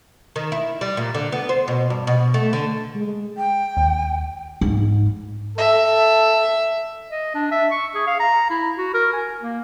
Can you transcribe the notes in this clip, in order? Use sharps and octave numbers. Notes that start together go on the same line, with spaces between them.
D#3
E4
G3
A#2
D3
B3
C5
B2
G2
B2
A3
D3
G#3
G5
D#2
G#2
A4 E5
D#5
D4
E5
C#6
G#4
F5
A#5
E4
F#4
A#4
G#5
A#3